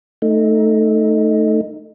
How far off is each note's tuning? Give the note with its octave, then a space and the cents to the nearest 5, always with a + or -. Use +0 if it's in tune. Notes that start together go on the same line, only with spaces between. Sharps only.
A3 +0 D#4 +0